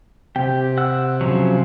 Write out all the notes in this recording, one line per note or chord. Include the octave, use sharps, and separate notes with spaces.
C3 G4 G5
F#5 E6 F#6
C#3 F3 F#3